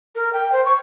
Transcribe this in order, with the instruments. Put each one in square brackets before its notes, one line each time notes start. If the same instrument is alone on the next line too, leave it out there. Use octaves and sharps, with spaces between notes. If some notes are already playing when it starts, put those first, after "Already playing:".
[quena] A#4
G5
C5
C#6